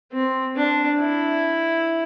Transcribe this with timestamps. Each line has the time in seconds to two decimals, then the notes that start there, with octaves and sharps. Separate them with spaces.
0.13 C4
0.56 D4
1.00 E4